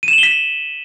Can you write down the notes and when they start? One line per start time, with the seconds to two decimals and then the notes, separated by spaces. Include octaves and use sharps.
0.03 D#7
0.08 E7
0.13 F#7
0.18 G7
0.23 B6